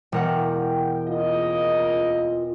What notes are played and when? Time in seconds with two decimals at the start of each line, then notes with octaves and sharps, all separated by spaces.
0.12 E1 A#4 F#5 G5
1.08 C#3 A#3 F4 D#5